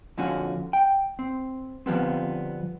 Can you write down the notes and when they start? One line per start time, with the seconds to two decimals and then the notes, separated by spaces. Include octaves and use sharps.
0.18 F2 A#2 D3 F3 C#4 F#4
0.73 G5
1.19 C4
1.86 D3 F3 G3 B3 C4